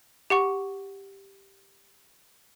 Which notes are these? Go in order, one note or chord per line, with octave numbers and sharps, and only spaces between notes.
G4 F#5 C#6